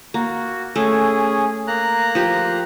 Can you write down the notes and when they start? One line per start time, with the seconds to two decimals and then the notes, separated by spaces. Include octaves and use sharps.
0.14 A#3 F#4
0.76 A3 C#4 G#4
1.68 A#3 A#5 F#6
2.15 F3 G4